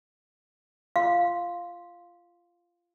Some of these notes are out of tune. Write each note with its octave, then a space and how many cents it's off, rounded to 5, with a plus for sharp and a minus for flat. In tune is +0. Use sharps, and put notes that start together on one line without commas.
F4 -20 F5 +5 C6 +0